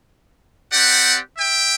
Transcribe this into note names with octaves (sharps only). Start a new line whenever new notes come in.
C4 G4 D5 F#5
E5 G5